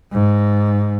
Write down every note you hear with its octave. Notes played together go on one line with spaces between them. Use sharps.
G#2